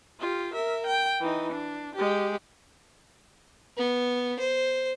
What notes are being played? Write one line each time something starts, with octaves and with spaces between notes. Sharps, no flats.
F4 G4
A#4 E5
G5
E3 D#4
D4
G#3 G4
B3
C5